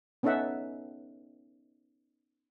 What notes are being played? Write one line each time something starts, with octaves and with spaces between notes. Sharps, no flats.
B3 C#4 D#4 A4 E5 F#5